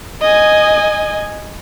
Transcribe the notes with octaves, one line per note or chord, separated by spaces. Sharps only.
D#5 G#5